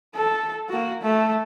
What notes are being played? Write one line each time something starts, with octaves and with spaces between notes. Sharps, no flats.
A4
A#3 F#4
A3